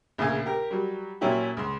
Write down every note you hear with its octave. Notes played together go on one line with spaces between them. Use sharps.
A#1 A2 C#3 F5 G#5
G4 A#4
F#3 G3
A#2 F#3 C#4 E4 G4
C#2 C6